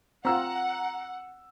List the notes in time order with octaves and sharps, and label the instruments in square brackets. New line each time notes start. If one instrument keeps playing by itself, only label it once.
[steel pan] C4 F4 [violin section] F#5 [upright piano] A#5 E6